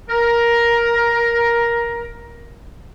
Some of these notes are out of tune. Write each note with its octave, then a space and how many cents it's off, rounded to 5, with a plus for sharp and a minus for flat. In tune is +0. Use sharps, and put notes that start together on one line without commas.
A#4 +10